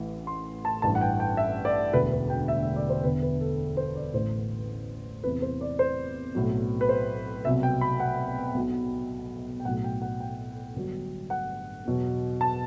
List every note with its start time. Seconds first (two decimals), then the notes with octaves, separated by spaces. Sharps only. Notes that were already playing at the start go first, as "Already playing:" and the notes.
Already playing: A1 A2 E3
0.27 C6
0.65 A5
0.82 A1 G2 E3 A5
0.95 F#5
1.01 G5
1.20 G5
1.37 E5
1.65 D5
1.93 E1 D2 D3 B4
2.12 B4
2.30 G5
2.48 E5
2.63 E5
2.76 D5
2.89 C5
3.03 E1 E2 D3 B4
3.22 B4
3.41 A4
3.77 C5
3.95 D5
4.13 A1 A2 E3 C5
5.24 E2 C3 E3 B4
5.42 C5
5.61 D5
5.79 C5
6.35 B1 A2 F#3
6.81 B4
6.89 C5
7.45 C2 B2 F#3 E5
7.63 G5
7.81 B5
8.00 F#5
8.54 B1 B2 F#3
9.60 G5
9.65 B1 A2 F#3 F#5
9.84 G5
10.02 F#5
10.20 G5
10.76 G1 G2 F#3
11.30 F#5
11.86 E2 B2 F#3
12.41 A5